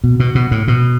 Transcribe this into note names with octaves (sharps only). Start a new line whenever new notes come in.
B2
B2
B2
A2
B2